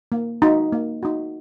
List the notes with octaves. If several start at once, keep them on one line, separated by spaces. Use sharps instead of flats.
A#3
D#4 F#4
A#3
D#4 F#4